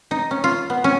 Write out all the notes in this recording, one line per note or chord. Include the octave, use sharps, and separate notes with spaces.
D#4
C#4
F4
B3
C#4